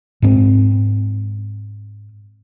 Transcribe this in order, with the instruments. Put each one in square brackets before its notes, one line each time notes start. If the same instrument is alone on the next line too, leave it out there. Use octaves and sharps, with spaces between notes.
[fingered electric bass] G#2 C4